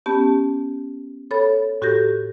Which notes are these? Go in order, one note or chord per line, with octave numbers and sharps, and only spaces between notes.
B3 C#4 G4 A5
A4 C#5 B5 A6
A2 F#4 G4 A4 G6 A#6